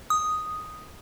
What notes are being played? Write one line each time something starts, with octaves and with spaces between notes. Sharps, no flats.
D#6